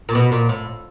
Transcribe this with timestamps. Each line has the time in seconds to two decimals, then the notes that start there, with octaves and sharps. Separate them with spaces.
0.09 A#2
0.15 B2
0.32 A#2
0.49 A2